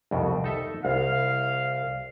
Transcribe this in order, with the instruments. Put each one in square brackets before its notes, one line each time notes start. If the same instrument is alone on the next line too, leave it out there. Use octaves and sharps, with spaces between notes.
[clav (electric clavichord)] C2 F2 B2
D#4 A4 E5
[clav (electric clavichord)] C2 [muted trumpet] F5